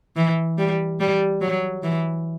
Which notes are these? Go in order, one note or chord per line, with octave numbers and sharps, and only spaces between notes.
E3
G3
G3
F#3
E3